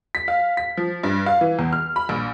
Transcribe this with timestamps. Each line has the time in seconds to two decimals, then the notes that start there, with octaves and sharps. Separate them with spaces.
0.15 B6
0.28 F5
0.57 B6
0.77 F3
1.04 G2
1.26 F5
1.41 E3
1.59 E2
1.73 F6
1.96 B5
2.09 A#1